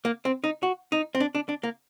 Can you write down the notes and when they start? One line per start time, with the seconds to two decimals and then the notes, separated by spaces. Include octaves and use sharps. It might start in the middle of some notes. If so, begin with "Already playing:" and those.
0.05 A#3
0.25 C4
0.44 D#4
0.63 F#4
0.92 D#4
1.15 C4
1.20 D4
1.35 D4
1.49 D4
1.63 A#3